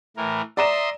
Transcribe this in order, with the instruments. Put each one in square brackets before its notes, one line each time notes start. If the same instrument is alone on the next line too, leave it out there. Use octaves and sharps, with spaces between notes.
[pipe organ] A2 E3 A#4
[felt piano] D5 A#5 E7 [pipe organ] E5 C6 D#6